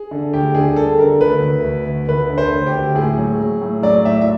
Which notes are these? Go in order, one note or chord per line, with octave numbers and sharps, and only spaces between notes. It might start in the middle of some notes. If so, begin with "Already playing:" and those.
Already playing: G#4
D3
D2 G4
D3 G#4
G3 A4
D3 A#4
D2 B4
D2
D2
D2
D2 B4
D3
C5
D2
G4
D2
A2 G#4
F#3
F#3
A2
F#3 D5
A2 E5
E5